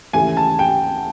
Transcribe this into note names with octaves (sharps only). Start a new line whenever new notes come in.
D#2 C#3 E3 A3 G#5
A5
G5